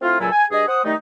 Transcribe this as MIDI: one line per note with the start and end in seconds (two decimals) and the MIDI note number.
0.01 0.17 57
0.01 0.17 60
0.01 0.17 64
0.01 0.17 65
0.20 0.30 37
0.20 0.30 46
0.20 0.30 54
0.20 0.30 64
0.20 0.30 69
0.20 0.30 80
0.32 0.45 80
0.51 0.65 43
0.51 0.65 68
0.51 0.65 75
0.67 0.83 72
0.67 0.83 78
0.67 0.83 87
0.84 0.94 51
0.84 0.94 55
0.84 0.94 57
0.84 0.94 63